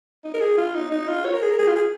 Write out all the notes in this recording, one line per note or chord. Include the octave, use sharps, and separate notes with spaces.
D#4
A#4
G#4
F4
D#4
D#4
F4
C#5
A#4
G#4
A#4
G#4
F4
G#4